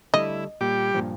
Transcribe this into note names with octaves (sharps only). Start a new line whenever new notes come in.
D3 G3 A3 E4 D#5
A#2 G3 G4 D6
G2 A#2 F3